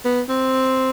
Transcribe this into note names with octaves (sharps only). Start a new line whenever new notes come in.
B3
C4